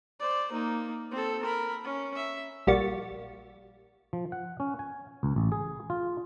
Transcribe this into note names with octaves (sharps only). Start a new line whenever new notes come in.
C5 D5
A#3 D#4
C4 A4
A#4 B5
C#4
E5
A#1 G3 A#3 F#4 C#6 A6
F3
F#5
C#4
G#5
C#2
A1
G#4
F4